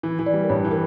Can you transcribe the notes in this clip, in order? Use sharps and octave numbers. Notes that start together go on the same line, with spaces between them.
E3
E3
D5
G3
A#4
G2 C#5
E3
A#4